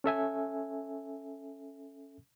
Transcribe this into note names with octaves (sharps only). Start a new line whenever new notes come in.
C#4 A4 E5 G#5